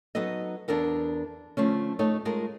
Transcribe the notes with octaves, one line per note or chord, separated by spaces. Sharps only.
F#3 B3 D#4 A4 D#5
E2 D4 A4 A#4 F#5
D3 F3 A3 C#4
A3 D#4 A4 C#5
G#3 F4 A4 A#4